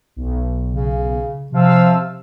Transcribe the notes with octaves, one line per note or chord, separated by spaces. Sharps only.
B1
C#3
C3 F3 F5 E6